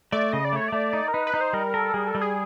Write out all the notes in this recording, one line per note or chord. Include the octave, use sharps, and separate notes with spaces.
A3 D5
C#3 D#5
D5
A3 C#5
A3 D5
D#4
A#4
D#4 B4
B4
D#4
C5
G3 A#4
A4 A#4
G3 G#4
A4
G3
G#4